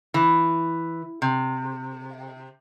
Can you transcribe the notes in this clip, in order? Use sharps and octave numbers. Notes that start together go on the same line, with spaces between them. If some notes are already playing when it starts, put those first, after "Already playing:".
E3
C3